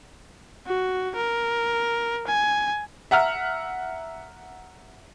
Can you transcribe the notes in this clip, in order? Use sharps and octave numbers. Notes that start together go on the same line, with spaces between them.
F#4
A#4
G#5
E5 F#5 A#5 F6